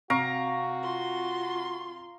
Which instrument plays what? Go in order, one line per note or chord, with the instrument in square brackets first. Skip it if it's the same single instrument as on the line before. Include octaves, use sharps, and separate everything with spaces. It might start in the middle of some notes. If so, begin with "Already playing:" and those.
[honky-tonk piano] C3 D7 [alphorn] F#4 [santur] F5 A#5 C#6
[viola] F4 C6